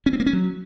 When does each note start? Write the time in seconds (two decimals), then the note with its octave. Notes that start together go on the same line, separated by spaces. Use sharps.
0.06 C#4
0.13 C4
0.20 A#3
0.26 C#4
0.33 F#3